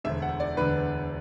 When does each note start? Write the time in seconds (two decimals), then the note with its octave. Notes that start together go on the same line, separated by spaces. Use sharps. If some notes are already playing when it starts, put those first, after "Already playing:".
0.04 E1 D2 D3 E5
0.22 F#5
0.40 D5
0.57 E1 D2 D3 B4